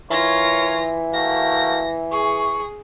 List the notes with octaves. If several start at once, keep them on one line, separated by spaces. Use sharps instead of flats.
E3 F4 A#4 C#5 A#6
A3 A#3 F#4 A#6
G#4 C#6